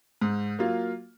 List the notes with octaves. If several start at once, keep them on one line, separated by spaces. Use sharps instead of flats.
G#2
F#3 A#3 F4